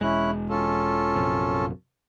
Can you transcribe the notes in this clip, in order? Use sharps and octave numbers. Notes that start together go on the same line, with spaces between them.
E1 G#3 C#4 E4 F#6
C#4 F4 A4
A#1 F#2 C3